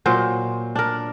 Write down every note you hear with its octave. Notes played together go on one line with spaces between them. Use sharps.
A#2 F#3 C5
D4 A#4